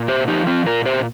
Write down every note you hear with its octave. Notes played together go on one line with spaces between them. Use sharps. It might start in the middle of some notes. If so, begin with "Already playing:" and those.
Already playing: A#2
G4 C5
F3 D#4 G4
C4 F4
A#2 F4 A#4
G4 C5